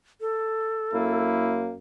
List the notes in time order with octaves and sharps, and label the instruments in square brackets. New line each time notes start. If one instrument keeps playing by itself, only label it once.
[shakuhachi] A4
[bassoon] F#2 [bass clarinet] A#3 [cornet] E4